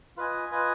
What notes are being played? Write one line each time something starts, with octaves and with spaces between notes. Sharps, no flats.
F4 B4 D#5 G#5
F4 B4 D#5 G#5